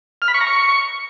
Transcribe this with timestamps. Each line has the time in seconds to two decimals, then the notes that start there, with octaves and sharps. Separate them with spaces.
0.22 F6
0.28 B5
0.34 C#6
0.41 A#5
0.47 C#6